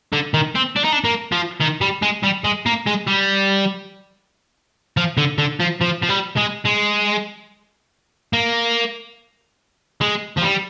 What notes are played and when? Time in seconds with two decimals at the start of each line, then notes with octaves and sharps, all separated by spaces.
0.13 D3
0.34 D#3
0.55 C4
0.76 D4
0.84 D#4
0.92 D4
1.04 A#3
1.32 F3
1.60 D#3
1.81 G3
2.03 G#3
2.24 G3
2.44 G#3
2.66 A#3
2.86 G#3
3.07 G3
4.97 F3
5.17 D3
5.38 D3
5.60 F3
5.81 F3
6.02 F3
6.09 G3
6.37 G#3
6.65 G#3
8.33 A#3
10.01 G#3
10.38 F3
10.43 G3